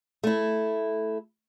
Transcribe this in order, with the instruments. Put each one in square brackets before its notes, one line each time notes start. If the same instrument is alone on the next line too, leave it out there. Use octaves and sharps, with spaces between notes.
[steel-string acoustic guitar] A3 E4